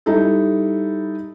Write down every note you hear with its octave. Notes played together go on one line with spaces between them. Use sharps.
G3 D#4 E4 A4